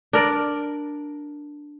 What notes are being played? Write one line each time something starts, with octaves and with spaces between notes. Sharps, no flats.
D4 A#4 D5